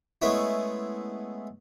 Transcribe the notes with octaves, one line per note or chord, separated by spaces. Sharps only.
G#3 A3 B3 C#4 E4